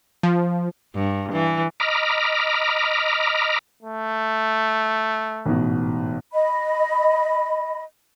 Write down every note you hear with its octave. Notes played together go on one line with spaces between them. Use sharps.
F3
G2
E3
D#5 A#5 B5 D6 F6
A3
A1 G#2 B2
D#5 B5